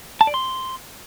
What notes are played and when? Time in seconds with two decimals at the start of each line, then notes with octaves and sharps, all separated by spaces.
0.21 A5
0.27 D5
0.34 C6